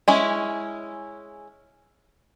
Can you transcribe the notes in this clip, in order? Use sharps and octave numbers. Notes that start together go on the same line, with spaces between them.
G#3 C#4 E4